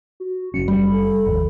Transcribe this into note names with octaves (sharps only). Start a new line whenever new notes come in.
F#4
F#1 F#3 C#4 C#7
G3 B5
A4
G1 D#2 F3